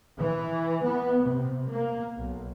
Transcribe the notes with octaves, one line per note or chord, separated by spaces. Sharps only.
E3
B3
C3
A#3
B1